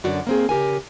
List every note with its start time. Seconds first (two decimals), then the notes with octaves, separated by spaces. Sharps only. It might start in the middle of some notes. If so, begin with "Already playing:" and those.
0.04 F#2 D3 F#4 D5
0.27 A#3 C4 G#4
0.49 C#3 G4 A#4 G#5